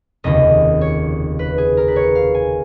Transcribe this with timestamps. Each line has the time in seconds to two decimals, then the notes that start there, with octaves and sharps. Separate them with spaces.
0.24 F1 D#2 C#3 D#5
0.81 C#5
1.39 B4
1.58 G#4
1.77 A#4
1.88 B4
1.96 C#5
2.15 F5
2.34 G#5